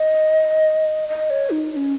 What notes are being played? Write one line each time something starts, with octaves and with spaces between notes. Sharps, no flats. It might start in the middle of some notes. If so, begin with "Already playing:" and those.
Already playing: D#5
D#5
C#5
D#4
D#4
C#4